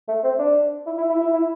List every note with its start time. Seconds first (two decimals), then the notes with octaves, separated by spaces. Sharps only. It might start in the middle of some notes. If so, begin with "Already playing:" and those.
0.08 A3
0.24 C4
0.39 D4
0.86 E4
0.98 E4
1.10 E4
1.21 E4
1.34 E4